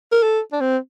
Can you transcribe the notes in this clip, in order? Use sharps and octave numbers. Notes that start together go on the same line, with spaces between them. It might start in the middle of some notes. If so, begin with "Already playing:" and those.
A#4
A4
D4
C4